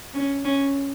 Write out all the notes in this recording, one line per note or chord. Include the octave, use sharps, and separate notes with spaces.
C#4
C#4